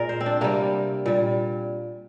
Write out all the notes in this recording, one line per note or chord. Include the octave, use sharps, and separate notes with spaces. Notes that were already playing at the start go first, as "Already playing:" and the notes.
Already playing: A#2 G#3 A#4 D5
C5
C4
D4
C3 G3 A#3
A#2 G3